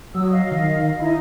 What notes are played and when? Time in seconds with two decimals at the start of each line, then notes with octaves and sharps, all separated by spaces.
0.14 F#3 D#6 E6
0.30 D#5 F5
0.51 D#3
0.99 D#4 E4 D#5